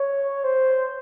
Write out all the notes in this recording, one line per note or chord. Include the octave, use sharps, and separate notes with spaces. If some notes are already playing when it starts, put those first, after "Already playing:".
Already playing: C#5
C5